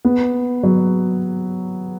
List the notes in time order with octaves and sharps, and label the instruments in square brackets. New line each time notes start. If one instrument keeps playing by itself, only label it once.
[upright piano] B3
F#3